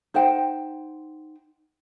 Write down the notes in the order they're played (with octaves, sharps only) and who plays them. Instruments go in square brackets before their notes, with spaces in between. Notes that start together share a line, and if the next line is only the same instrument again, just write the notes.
[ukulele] D#4 C5 F#5 G5